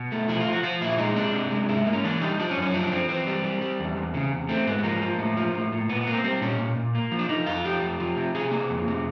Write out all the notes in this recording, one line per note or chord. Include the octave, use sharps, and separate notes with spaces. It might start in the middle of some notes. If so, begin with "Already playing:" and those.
Already playing: B2
A3
F3 E4
F4
F3
F#4
F3 F4
A#2 E4
G#3 D#4
C3 D4
C3
G#3
G#2 E4
A#3
C#4
E3 D4
G3 D#4
F3 D4
C#4
F#2
C#4
F3 D4
F3 C4
E3 C4
G3
G3
G3
E2
E2
C#3
E2
A3 C4
G#2 B3
B3
F3 A#3
F3
A2
F3
A2
A2
A#2 B3
B3
A#3
C4
G3 C4
A#2 C#4
A#2
A#2
A#3
F3
D4
F3 D#4
F2 F4
F3 G4
F2
F3
C3
C3 G#4
A#3
F2
C3